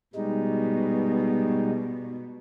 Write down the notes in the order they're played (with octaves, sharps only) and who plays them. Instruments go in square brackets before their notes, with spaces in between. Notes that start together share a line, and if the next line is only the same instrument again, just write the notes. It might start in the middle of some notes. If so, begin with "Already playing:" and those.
[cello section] B2 [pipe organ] G3 G#3 D#4